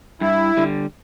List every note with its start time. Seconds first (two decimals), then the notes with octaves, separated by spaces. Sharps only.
0.21 G2 E4
0.57 D3 G3